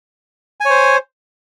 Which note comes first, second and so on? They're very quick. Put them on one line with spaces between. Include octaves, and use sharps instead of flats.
G#5 C#5 C5